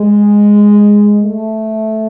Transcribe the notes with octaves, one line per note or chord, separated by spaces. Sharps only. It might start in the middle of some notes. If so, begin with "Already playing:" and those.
Already playing: G#3
A3